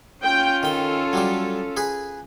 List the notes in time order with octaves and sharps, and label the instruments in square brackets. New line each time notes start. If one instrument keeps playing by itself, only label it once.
[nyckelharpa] C#4 F4 [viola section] G5
[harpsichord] D#3 G5 [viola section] A4
[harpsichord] F#3 G3 D6
G#4 B4 G#5